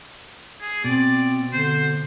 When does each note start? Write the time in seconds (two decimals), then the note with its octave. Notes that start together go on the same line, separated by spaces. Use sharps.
0.62 G#4
0.84 B2 C4 D5
1.53 D3 C5